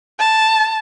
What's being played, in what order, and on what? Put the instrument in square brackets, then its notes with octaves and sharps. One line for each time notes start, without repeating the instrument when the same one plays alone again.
[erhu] A5